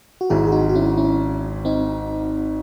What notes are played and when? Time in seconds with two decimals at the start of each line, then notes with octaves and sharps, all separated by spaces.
0.21 F#4
0.30 G#1 G#2 F#3 E4 G#4
0.47 G#4
0.52 D#4 F#4
0.69 F#4
0.75 C#4 E4
0.97 C#4 E4
1.65 C4 D#4